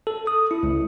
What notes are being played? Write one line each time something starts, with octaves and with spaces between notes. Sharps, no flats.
A4
D#6
E4
C#2